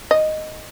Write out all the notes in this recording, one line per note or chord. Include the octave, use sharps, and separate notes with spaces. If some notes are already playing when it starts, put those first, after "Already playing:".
D#5